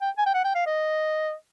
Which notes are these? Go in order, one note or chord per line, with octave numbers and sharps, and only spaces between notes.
G5
G#5
G5
F#5
G5
F5
D#5